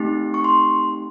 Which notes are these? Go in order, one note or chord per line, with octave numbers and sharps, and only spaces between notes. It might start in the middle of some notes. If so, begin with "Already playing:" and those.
Already playing: A3 C4 D#4 G4
C#6
C6